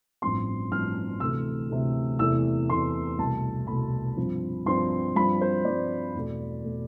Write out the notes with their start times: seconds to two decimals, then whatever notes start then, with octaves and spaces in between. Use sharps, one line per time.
0.22 A1 G2 F3 C4 C6
0.71 A1 G2 F3 C4 F6
1.20 D2 C3 E3 A3 E6
1.70 D2 C3 E3 A3
2.19 E2 C3 E3 A3 E6
2.69 E2 C3 E3 A3 C6
3.18 C2 B2 A3 A5
3.67 C2 B2 A3 B5
4.17 G2 F3 C4
4.66 G2 F3 C4 C6
5.15 G2 F3 C4 B5
5.41 C5
5.65 G2 F3 C4 D5
6.14 E2 B2 A3
6.64 B2 A3